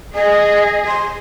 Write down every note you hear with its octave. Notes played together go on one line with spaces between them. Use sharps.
G#4 D#5
C6